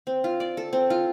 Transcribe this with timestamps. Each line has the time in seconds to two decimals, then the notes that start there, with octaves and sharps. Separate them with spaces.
0.07 C4
0.24 F4
0.40 D5
0.57 A4
0.73 C4
0.90 F4